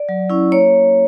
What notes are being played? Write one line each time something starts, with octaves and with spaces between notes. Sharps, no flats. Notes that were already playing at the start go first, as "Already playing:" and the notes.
Already playing: D5
F#3
C#4 E4
A#3 C#5